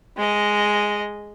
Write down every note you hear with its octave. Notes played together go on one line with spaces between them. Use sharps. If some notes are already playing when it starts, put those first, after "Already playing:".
G#3 D#5